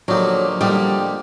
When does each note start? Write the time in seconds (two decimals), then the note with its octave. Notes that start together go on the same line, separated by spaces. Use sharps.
0.08 D3 F3 F#3 A#3 D#4 G4
0.61 D3 F3 G3 A#3 D#4 G4